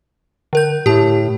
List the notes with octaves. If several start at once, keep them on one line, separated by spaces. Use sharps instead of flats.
D3 A#4 G6
A2 G4 A5